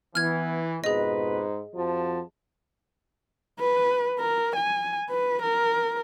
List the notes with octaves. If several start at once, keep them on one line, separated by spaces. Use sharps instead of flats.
E3 B3 F6 G#6
F2 G#2 B2 G#4 B4 D#5
F2 F3 F#4 A5
B4
A#4
G#5
B4
A#4